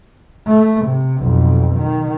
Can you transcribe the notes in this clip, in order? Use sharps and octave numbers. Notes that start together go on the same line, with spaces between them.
A3
C3
B1 F2
D#3